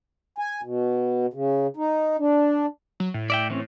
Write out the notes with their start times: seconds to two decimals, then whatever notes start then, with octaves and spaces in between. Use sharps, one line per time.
0.38 G#5
0.63 B2
1.33 C#3
1.77 D#4
2.19 D4
3.00 F#3
3.14 A2
3.30 D5 E5 G5
3.50 E3 C4 C#4